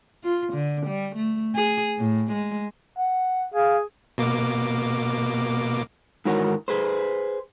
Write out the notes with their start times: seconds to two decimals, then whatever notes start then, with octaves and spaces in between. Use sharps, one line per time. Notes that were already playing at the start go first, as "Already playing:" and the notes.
0.24 F4
0.54 D3
0.87 G3
1.16 A3
1.55 G#4
1.98 A2
2.33 G#3
2.97 F#5
3.54 G#4 F5
4.18 B2 A#3 D6
6.25 G#2 D#3 E3 F#4 A#4 C#5
6.68 G#4 B4 C5